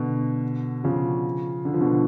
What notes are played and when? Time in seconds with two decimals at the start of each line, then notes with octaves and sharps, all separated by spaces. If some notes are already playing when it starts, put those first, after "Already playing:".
Already playing: B2 D3
0.84 C#3 F3
1.65 D3
1.74 F3
1.80 B2 D3